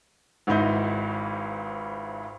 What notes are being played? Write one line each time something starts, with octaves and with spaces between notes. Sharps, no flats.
G#1 C#2 G#2 E4 D#5 G6